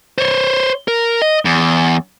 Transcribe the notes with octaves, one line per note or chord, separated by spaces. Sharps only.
C5 C#5
A#4
D#5
E2